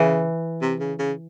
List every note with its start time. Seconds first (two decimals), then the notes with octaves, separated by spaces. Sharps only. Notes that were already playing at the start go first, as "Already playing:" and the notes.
Already playing: C#3 E3
0.62 C3
0.80 C#3
0.99 C#3